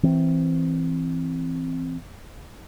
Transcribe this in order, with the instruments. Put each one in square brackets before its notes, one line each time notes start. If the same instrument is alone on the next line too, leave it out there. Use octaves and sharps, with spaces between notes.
[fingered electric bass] E3 C4